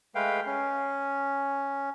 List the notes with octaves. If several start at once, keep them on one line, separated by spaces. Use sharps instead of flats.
G#3 A3 B4 F5 G5
C#4